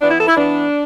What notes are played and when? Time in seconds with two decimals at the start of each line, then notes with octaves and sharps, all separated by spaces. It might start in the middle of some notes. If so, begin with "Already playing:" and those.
0.02 E3 B3 D4
0.10 E4
0.19 A4
0.28 E4
0.36 E3 B3 D4